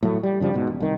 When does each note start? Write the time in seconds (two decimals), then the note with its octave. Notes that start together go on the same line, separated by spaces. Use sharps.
0.03 A2 F#3 A3
0.23 G3
0.40 G2 C#3 F3 G3
0.54 G#2 B2
0.67 E1
0.80 C2 D#3